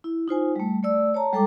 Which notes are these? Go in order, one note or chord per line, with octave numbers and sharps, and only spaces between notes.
E4
D#4 F4 C5 G#5
G3 A3
A3 D5 E6
C#5 A5 A#5
G3 G#3 A4 G5 A#5 D6